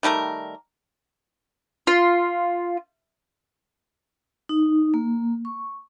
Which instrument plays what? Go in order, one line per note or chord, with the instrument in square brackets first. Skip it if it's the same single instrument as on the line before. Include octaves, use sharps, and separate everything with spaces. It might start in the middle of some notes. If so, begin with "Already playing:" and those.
[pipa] D#3 G3 A3 A#4
[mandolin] F4
[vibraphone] D#4
A#3
C#6